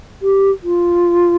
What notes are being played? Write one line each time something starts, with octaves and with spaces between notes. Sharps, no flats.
G4
F4